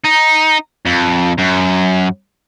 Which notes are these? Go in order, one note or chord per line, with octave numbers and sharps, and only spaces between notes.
D#4
F2
F#2